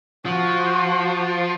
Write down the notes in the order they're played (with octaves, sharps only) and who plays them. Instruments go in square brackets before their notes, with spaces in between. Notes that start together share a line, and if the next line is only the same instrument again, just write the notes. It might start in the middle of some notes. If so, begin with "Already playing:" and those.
[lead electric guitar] F3 [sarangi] F#4